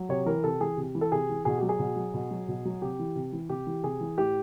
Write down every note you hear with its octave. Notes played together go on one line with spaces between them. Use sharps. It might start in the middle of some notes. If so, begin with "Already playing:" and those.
Already playing: F#3
C3 C#5
E3 A#4
C3 A4
E3 G#4
C3
E3
A4
C3 G#4
E3
B2 G#4
F#3 G4
G#4
B2
F#3
B2
F#3
B2
F#3
C3 G4
E3
C3
E3
C3 G4
E3
C3 G#4
E3
A2 G4